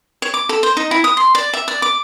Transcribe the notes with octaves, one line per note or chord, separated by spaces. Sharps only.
C#5
D6
A4
C5
D#4
E4
D#6
C6
D5
E5
D5
D6